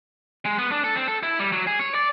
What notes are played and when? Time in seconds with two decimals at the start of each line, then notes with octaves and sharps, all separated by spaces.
0.45 G#3
0.58 B3
0.72 D4
0.84 A4
0.96 C4
1.08 A4
1.23 E4
1.39 G3
1.52 F#3
1.67 G#4
1.79 C#5
1.95 D5